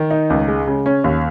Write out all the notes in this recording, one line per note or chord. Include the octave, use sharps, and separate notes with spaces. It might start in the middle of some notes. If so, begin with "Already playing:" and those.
Already playing: D#3
D#4
C#2
G#3
C#3
C#4
D#2